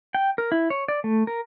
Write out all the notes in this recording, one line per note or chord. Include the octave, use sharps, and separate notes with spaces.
G5
A#4
E4
C#5
D5
A3
A#4